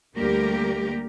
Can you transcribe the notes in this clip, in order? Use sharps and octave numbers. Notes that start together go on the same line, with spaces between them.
D2 G3 A3 A#3 G4 A#4